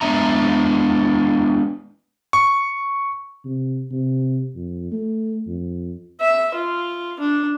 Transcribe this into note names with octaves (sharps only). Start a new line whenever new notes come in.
G#3 B3 D4 E5 A#5
C#6
C3
C3
F2
A3
F2
E5
F4
D4